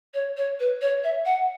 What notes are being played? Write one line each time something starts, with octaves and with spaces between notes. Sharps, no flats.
C#5
C#5
B4
C#5
E5
F#5